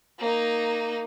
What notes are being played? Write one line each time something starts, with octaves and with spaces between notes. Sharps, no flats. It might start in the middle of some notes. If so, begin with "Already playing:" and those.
A#3 D#4